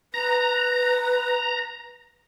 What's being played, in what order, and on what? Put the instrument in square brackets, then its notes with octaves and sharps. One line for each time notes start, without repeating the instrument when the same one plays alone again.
[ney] B4 [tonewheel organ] A#5